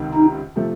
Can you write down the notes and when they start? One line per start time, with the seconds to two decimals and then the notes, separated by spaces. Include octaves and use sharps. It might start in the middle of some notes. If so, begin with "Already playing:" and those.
Already playing: C#2 C3 D#3
0.15 D#4
0.56 C3 F3 A3